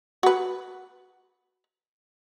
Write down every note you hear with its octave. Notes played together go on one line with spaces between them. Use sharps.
F#4 B4